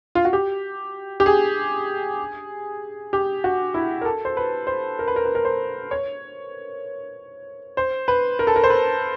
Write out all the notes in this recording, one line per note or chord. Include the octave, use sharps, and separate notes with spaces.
F4
F#4
G4
G4
G#4
G4
F#4
E4
A#4
A4
C5
B4
C5
A#4
B4
A#4
B4
A#4
C5
C#5
C5
B4
A#4
A4
A#4
C5
B4